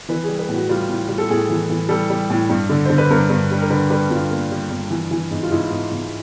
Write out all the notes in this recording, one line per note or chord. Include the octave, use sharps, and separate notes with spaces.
E3 B4
G#4
G3
B4
A2
F#4
G3 F4
A2
G3
A4
A2 G#4
E3
E3
G3 A4
G3
A2
G2
D3
D3 C5
B4
G2 A#4
G2
G3
A#4
D3 B4
G3 B4
G2 F4
A#3
G3
G2
E3
E3
G#2
F4
G#2 E4
G#2
G#2